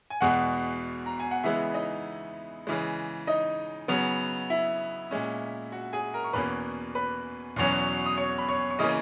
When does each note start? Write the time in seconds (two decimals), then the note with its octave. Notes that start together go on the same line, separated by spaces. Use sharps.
0.10 G#5
0.21 E2 B2 G#3 F#4 F#5
1.06 A#5
1.20 G#5
1.31 F#5
1.43 C#3 E3 G#3 B3 E4 E5
1.74 D#4 D#5
2.67 C#3 E3 G#3
3.27 D#4 D#5
3.88 C#3 F#3 B3
4.50 E4 E5
5.11 A#2 G#3 C#4
5.72 F#4 F#5
5.93 G#4 G#5
6.14 A#4 A#5
6.24 C#6
6.33 E2 B2 A#3 C#4 B4 B5
6.95 B4 B5
7.56 E2 B2 F#3 C#4
8.06 D#6
8.17 C#5 C#6
8.38 B5
8.49 C#5 C#6
8.70 C#6
8.79 C#3 E3 A#3 C#4 D#5 D#6